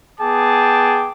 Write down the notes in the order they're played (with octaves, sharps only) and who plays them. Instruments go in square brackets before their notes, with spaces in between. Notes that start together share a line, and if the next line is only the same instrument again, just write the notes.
[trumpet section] B3 G#4 G5 A5 D6